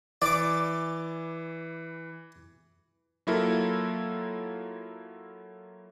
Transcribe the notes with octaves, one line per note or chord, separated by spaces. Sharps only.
E3 D5 D6
F#3 A#3 E4 F4 A4 A#4